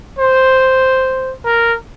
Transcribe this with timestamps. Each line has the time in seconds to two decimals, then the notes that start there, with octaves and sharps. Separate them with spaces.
0.19 C5
1.45 A#4